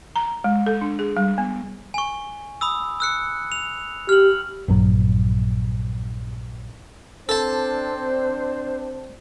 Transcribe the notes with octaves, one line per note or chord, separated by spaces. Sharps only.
A#5
G#3
A4
D4
G#4
G3
B3
G#5 C#6
B5 D#6 E6
E6 F#6 C#7
F7
G4 F6 F#7
A#1 G2 F#3
C4 D4 A4 C5 A5